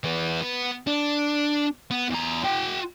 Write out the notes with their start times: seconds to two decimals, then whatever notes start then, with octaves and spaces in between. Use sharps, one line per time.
0.04 E3 B3
0.41 B3
0.87 D4
1.91 B3
2.10 E2 A#5
2.44 F#4 G5